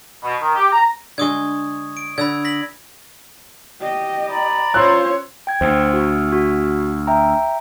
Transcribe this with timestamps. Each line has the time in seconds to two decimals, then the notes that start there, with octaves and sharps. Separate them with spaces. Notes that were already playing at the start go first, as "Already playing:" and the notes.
0.24 B2
0.41 D#3
0.55 G4
0.72 A#5
1.18 D3 G#3 C#6 D#6 G#6
1.97 D7
2.18 D3 B5 E6 G#6
2.45 A#6 B6 F#7
3.81 G4 D#5
4.28 D5 A#5 B5
4.74 C#4 F4 C5 C#5 C6 E6 F#6
5.47 G5 G#6
5.61 D2 C5
5.93 F#4
6.32 F#4
7.07 E5 G5 A#5